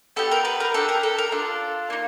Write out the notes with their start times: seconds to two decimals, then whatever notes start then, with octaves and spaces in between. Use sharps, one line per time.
0.16 B3 D4 G4 A4
0.31 A#4
0.45 B4
0.60 A#4
0.74 D4 G4 A4
0.89 A#4
1.03 A4
1.18 A#4
1.32 D4 F4 A4
1.90 A#3 D#4